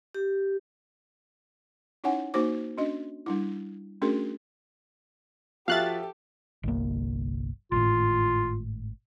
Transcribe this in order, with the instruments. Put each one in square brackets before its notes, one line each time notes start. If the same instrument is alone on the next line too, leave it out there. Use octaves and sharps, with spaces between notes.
[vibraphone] G4
[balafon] C#4 D#4 E4 C#5 F#5 G#5
A#3 D#4 F#4 C5 D6
C#4 D4 F#4 D#5
G3 D4 E4
A3 C#4 D4 F#4 G#4 A#4
[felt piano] F3 F#4 E5 [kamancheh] G4 A4 [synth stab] F5 F#6 A6
[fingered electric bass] G1 C2 A#3
[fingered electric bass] G#1 A2 [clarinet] F4